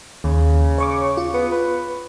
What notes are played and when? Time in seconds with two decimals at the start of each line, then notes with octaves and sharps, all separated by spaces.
0.24 D#2 C#3
0.78 C#5 C#6 D6
1.17 F4
1.34 B3
1.52 B4